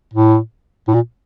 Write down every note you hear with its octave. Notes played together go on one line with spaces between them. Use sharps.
A2
A2
A#2